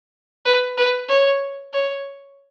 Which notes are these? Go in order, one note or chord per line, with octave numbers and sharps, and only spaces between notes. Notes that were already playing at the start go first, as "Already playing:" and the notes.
B4
B4
C#5
C#5